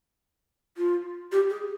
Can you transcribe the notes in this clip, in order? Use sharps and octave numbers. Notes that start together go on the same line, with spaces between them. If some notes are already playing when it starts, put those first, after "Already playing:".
F4
G4
G#4